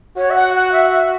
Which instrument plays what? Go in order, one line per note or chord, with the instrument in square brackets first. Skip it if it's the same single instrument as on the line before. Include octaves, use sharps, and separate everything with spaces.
[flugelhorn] F#4 [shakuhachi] C#5
[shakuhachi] E5
F#5
F#5
E5
E5